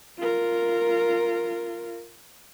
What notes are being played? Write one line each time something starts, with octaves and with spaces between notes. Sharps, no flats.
F4 A#4